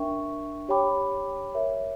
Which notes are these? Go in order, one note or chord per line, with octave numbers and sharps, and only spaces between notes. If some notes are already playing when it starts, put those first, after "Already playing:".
Already playing: D4 A#4 E5 G5 C#6
G4 C#5 G5 B5 D6
A#4 C#5 E5